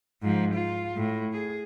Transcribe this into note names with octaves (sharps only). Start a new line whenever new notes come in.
G#2 F3
F4
A2
G#4